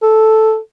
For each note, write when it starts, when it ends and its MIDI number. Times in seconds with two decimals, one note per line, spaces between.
0.02 0.58 69